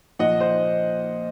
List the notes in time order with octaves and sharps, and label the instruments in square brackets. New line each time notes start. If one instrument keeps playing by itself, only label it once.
[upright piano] A#2 F3 D#5 F#5
C5 D#5